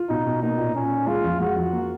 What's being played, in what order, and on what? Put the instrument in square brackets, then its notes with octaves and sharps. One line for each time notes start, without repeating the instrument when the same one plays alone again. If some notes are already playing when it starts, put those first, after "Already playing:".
Already playing: [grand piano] F4
[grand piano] B2 [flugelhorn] D#4
[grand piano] B2
[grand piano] A#3 [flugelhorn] D#4
[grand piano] A#2
[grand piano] A#2 [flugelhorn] C#4
[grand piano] A#3
[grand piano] G#3 [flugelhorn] F4
[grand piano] F2
[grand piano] G#3 [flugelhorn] F#4
[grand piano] F2
A#3